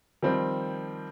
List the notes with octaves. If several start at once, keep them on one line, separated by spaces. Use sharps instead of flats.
D#3 F3 G3 C4